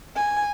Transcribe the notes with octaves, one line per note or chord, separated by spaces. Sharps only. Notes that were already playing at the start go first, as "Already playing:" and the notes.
G#5